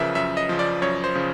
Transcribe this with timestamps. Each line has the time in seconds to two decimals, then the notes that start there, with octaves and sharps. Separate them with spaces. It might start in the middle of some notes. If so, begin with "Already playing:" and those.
Already playing: F#2 C#3 F3 A#4 B4 E5
0.15 F#2 E5
0.37 D#5
0.49 C#3 F3
0.59 D5
0.82 F#2 C#5
1.04 C5
1.15 C#3 F3